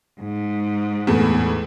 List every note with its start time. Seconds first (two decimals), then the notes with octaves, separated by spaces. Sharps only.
0.20 G#2
1.07 E2 A2